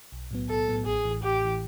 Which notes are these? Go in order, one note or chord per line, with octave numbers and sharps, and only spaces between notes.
B1
A2 F#3 B3
B1 A4
A2 F#3 B3
A1 G#4
A2 E3
A1 G4
A2 E3